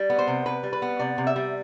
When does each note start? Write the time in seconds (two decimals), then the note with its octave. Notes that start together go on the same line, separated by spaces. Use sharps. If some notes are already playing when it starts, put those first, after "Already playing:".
Already playing: G3
0.10 B3
0.19 C5
0.28 C3
0.45 C3 B4
0.63 G3
0.73 B4
0.82 B3
0.99 C3 D5
1.18 C3
1.27 E5
1.36 G3